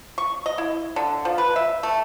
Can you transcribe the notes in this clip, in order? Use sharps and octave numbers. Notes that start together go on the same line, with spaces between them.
C#6
D#5
E4
D3
F3
B4
E5
A3